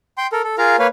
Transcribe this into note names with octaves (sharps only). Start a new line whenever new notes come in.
G5 C6
A4 A#4
A4
F4 G#4 A#4 F5 A#5
A#3 B4 C#5 F5